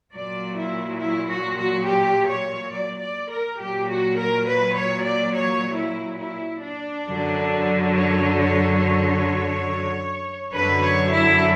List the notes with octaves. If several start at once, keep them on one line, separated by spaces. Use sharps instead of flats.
A#2 F#3 D5
E4
E4
F#4
F#4
G4
C#5
D5
D5
A#4
A#2 F#3 G4
F#4
A#4
B4
C#5
D5
C#5
E4
E4
D4
F#2 D3 F#3
C#5
C#5
C#5
F#2 D3 F#3 B4
C#5
E4